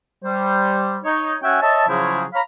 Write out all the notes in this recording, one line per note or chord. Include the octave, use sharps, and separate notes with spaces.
G3 C5
D#4 C#5
C#4 F#4 E5 G5 G#5
C#5 D#5 E5 A5
C#3 F3 F#3 E4 G#4 C5
C#5 F5 A#5 B5